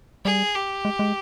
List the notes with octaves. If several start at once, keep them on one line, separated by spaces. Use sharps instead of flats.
G3 G#4
G4
G#3
G#3